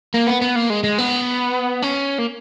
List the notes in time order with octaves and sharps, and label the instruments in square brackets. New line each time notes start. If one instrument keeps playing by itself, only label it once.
[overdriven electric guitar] A#3
B3
B3
A#3
G#3
G#3
B3
C#4
A#3